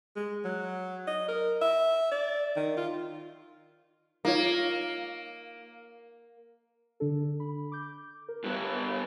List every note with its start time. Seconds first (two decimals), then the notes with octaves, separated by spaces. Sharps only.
0.16 G#3
0.45 F#3
1.07 D#5
1.28 A#4
1.61 E5
2.11 D5
2.56 D#3
2.77 F4
4.25 A#3 D#4 F4 C#5
7.00 D3 D4 A4
7.40 B5
7.72 D6 G6
8.28 A#4
8.44 G2 B3